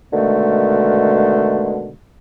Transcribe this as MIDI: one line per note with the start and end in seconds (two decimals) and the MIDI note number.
0.13 1.93 47
0.13 1.93 50
0.13 1.93 51
0.13 1.93 56
0.13 1.93 57